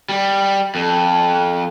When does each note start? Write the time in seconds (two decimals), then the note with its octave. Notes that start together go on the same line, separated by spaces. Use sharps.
0.09 G3
0.75 F2